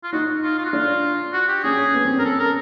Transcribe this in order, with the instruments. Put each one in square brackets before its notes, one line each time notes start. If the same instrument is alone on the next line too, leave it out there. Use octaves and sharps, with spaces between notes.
[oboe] F4
[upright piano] D#4 [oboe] F#4
[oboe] F4
F4
F#4
[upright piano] D4 [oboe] F4
[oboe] F#4
G4
[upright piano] C#4 [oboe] G#4
[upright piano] B3
C4
C#4
[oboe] A#4
A4
A#4